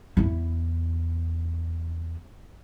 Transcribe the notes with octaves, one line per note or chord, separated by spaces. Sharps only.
E2 E4